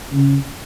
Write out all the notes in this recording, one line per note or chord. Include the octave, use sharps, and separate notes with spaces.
C#3